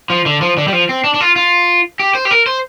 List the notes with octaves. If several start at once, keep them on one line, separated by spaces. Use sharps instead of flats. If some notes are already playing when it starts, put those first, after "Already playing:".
F3
D3
F3
D3
G3
F3
C4
D4
D4
F4
F4
G4
C5
G4
A#4
C5